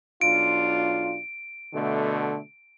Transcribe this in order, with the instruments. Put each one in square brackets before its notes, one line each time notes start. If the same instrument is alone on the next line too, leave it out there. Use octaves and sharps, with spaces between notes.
[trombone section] B1 D4 F4 [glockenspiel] D7
[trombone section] B2 D3 A3